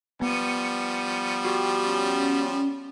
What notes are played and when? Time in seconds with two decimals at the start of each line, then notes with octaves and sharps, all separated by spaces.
0.22 F3 G3 B3 C#7 D#7
1.45 F#4 G4 G5
1.86 C#4